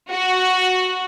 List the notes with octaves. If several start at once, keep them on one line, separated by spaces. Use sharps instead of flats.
F#4